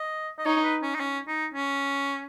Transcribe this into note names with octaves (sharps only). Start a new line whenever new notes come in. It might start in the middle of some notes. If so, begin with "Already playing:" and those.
Already playing: D#5
D#5
D#4 C#5
B4
C#4
D#4
C#4
D#4
C#4